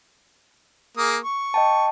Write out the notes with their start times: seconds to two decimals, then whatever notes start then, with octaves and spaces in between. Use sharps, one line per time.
0.97 A#3 G#4 D#6
1.24 C#6
1.54 D#5 G5 A5